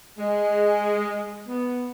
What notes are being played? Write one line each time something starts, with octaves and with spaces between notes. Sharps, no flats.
G#3
B3